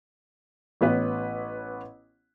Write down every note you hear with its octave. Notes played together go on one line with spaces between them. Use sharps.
A1 B3 B4 C#5